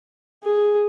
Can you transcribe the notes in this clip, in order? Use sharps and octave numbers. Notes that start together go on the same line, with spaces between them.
G#4